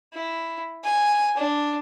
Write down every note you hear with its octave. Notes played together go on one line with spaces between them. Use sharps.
E4
G#5
D4